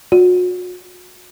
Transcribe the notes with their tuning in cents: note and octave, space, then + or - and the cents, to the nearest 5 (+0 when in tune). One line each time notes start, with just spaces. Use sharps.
F#4 -40